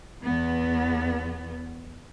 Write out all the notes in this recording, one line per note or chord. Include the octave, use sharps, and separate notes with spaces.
E2 B3